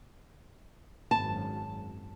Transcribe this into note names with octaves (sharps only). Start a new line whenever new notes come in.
G#1 F#2 A5